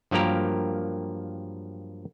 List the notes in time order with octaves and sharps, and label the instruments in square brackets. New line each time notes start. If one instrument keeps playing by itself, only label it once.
[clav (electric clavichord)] G2 F3 F#3 A#3 G4 A#4